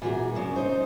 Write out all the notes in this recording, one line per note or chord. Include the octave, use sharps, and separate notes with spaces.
A#2 E3 F#4 G#4
F#2 C#3 D4
D#4 C5